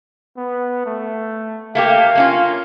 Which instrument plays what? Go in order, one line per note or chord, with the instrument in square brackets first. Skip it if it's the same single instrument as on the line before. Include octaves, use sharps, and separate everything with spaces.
[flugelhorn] B3
A3
[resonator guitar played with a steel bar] A3 A#3 G4 [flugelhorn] F5
[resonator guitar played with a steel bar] A#3 C#4 F4